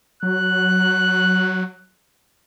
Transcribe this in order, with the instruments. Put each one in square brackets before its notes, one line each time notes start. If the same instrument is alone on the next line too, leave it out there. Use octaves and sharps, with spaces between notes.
[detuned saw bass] F#3 [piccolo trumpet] F#6